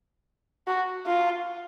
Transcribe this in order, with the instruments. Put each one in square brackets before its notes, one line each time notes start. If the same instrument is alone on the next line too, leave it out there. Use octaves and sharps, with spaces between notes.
[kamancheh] F#4
F4